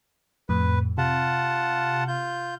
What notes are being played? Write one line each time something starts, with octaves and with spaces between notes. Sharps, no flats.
F2 A2 B4
C3 F4 F#5 A5
F4 G6